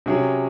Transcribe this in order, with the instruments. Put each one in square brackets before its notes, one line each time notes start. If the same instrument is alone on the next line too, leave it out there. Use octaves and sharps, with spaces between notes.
[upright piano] C3 F#3 C#4 G#4 C#5